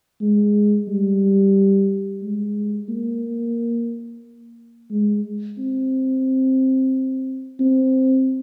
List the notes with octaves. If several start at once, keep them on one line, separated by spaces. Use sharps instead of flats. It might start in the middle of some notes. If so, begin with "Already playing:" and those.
G#3
G3
G#3
A#3
G#3
C4
C4